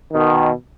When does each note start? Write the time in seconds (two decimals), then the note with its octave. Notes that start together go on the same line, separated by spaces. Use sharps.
0.13 B2 D#3